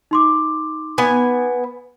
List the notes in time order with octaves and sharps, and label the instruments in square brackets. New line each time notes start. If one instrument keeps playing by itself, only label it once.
[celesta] D#4 C6 D6
[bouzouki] B3 G#5